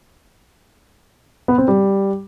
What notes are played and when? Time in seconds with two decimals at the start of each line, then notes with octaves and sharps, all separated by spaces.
1.48 B3
1.58 C4
1.68 G3